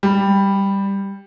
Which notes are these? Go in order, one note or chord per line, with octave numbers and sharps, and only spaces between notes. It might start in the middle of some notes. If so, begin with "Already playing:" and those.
G3